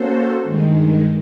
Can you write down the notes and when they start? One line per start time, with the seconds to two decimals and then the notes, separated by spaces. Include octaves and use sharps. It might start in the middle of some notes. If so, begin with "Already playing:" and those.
Already playing: A#3 C#4 F#4 A4 C5
0.43 G2 D#3 G#3